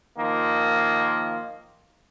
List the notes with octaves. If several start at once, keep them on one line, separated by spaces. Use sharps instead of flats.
D#3 F3 A#3